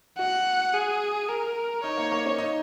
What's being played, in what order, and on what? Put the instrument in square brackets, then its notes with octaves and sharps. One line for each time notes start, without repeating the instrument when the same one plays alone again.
[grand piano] F#4 [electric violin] F#5
[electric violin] G#4
A#4
[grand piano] D#4 [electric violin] C#5
[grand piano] A#3
A#3
C#4
D#4